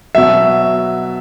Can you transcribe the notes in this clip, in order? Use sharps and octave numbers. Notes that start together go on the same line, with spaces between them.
B2 F#3 E5